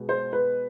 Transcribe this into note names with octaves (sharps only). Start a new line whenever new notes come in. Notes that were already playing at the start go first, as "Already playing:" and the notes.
Already playing: B2 G#3 B3
C5
B4